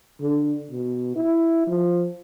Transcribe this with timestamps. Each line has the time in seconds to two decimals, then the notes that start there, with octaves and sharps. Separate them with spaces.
0.21 D3
0.71 B2
1.16 E4
1.67 F3